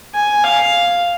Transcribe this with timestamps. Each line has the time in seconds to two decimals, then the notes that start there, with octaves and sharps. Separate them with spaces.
0.14 G#5
0.44 F5